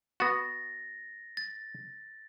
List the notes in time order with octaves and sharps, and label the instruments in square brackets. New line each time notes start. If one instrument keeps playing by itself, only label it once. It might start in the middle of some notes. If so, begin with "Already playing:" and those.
[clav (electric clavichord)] B3 F#4 [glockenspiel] A6 A#6
[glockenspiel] A6